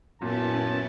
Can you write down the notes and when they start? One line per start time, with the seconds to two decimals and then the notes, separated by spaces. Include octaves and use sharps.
0.22 F#2 A#2 B3 C#4 E4 A5